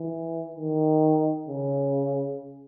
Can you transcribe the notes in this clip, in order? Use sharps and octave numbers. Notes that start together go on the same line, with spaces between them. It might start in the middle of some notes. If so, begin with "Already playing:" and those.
Already playing: E3
D#3
C#3